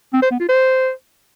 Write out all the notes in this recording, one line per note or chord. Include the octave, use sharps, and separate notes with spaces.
C4
C5
B3
F4
C5